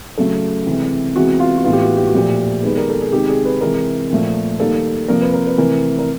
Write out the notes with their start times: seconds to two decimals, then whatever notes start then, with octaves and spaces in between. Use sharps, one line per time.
0.18 C#3 F#3 A3 A4
0.66 C3 E3 G#3
1.15 C3 E3 G#3 B3 F#4
1.40 F4
1.57 F#4
1.64 A2 E3 G#3 B3 F4
1.73 G4
1.81 F#4
1.97 G4
2.07 F#4
2.14 A#2 F3 A3 G4
2.63 D#3 G#3 B3 B4
2.78 A#4
2.90 A4
3.01 G#4
3.13 C3 D#3 G#3 G4
3.29 G#4
3.45 B4
3.61 C3 E3 G#3 A#4
4.10 A#2 F3 A3
4.60 D#3 G3 A#3 A4
5.08 C3 F3 A#3 A#4
5.21 B4
5.34 A#4
5.47 B4
5.58 C3 E3 A3 A#4
5.99 A#4